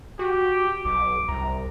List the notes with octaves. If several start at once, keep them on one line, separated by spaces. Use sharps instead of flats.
F#4 G4
B1 D6
C2 A#5